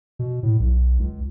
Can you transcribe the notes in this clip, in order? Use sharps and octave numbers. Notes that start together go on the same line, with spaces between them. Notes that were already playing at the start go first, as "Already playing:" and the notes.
B2
A2
B1
C#2